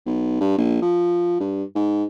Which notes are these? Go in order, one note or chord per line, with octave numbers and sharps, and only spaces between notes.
B1
G2
A#1
F3
G2
G#2